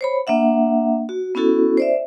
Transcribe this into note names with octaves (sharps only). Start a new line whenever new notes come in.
C5 C#5 B5
A#3 D4 E5 F#5
F#4
B3 C#4 E4 F#4 A4
C5 D5 E5